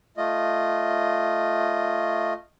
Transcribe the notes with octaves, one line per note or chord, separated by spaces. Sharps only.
A3 F4 D#5